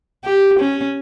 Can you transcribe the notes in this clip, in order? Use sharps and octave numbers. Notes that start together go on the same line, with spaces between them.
G4
C#4